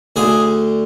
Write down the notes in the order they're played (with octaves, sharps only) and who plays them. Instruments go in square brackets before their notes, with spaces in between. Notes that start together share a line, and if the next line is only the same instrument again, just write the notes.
[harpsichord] D2 D3 G#4